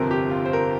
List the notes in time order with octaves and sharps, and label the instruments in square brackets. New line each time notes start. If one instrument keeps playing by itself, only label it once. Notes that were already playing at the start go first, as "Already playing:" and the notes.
Already playing: [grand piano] G1 F2 C3 F3 A#4
G4
F4
C5
A#4